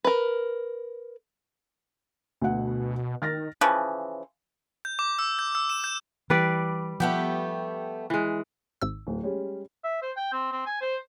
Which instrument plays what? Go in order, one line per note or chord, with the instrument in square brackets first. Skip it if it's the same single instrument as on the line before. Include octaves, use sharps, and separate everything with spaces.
[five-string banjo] A#4 B4
[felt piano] D2 F#5 [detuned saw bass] B2
[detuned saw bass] D#3 [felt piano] F6 A6 A#6
[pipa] C#3 E3 F3
[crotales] G6
D6
E6
G6
E6
E7
G6
[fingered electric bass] E3 [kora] G3 B4 D5
[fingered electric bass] F3 [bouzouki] A3 B3 G4
[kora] E3 G#3
[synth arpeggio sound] G#1 G#2 E6
[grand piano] D1
G3 G#3 C#4
[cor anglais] E5
C5
G5
C4
C4
G#5
C5